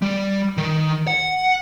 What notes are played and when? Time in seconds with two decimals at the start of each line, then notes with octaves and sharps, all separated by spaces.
0.02 G3
0.57 D#3
1.07 F#5